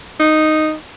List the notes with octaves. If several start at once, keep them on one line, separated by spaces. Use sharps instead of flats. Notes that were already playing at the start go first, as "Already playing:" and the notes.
D#4